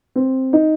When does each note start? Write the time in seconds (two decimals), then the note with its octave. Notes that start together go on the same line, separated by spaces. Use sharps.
0.16 C4
0.53 D#4